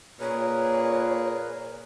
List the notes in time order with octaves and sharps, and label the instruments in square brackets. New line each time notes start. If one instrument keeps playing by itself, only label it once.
[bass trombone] A#2 [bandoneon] G#4 A#4 B4 [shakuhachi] C#5